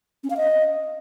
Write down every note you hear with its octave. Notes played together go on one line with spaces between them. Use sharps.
C#4
F5
D#5